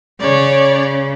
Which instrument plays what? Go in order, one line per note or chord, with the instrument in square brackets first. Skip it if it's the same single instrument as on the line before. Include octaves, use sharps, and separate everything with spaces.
[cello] C#3 [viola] C#5 D5